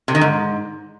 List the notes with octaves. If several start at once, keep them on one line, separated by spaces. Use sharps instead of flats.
C3
D#3
G#2